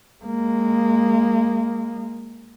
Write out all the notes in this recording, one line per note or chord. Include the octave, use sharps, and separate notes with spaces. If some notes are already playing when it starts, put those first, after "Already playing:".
G#3 A#3